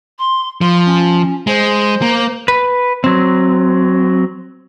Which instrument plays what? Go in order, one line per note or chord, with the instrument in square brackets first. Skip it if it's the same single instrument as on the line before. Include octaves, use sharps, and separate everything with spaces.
[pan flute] C6
[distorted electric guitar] F3 [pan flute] C6
[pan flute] C#4
[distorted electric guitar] G#3 [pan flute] C5
[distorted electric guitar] A#3
[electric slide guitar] B4
F#3 C4